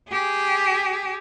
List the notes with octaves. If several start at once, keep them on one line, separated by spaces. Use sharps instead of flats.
G4 G#4